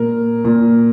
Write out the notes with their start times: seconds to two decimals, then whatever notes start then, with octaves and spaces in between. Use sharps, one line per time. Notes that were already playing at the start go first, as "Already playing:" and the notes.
Already playing: A#2 A#4
0.45 A#2